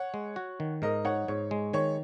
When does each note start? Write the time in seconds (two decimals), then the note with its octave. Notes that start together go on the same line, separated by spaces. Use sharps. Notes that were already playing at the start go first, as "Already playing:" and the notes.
Already playing: C#5 F#5
0.14 G#3
0.36 F#4
0.60 D#3
0.82 G#2 A#4 D#5
1.05 D#4 C#5 F#5
1.28 G#2 C#5
1.51 G#3
1.73 D#3 C#5